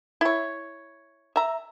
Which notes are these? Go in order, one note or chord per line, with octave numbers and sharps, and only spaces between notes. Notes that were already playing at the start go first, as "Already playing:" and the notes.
E4 C#5
E5 A#5